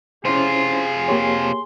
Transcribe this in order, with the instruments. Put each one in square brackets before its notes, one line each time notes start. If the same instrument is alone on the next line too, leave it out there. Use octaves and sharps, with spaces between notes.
[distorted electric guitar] C3 F4 [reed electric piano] C#4 E4 C5 [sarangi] G#4 [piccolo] C6
[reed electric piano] A#3 G4 C#5 [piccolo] C6